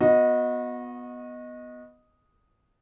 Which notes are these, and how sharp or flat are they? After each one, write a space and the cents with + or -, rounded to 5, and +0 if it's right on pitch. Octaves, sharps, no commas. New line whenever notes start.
B3 +0 F#4 -30 D#5 +0